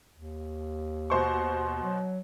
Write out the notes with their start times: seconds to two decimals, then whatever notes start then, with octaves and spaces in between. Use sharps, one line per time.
0.13 D#2
1.10 B2 C5 C#6
1.83 F#3